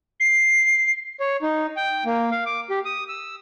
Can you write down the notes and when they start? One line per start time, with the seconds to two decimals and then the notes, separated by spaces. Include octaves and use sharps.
0.20 C7
1.20 C#5
1.42 D#4
1.77 G5
2.06 A#3
2.31 F5
2.46 D6
2.70 G4
2.85 D#6
3.09 E6